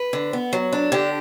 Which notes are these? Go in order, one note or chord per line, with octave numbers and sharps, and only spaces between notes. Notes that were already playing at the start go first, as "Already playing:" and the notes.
Already playing: B4
D3
B3
F#3
D4
D3 G4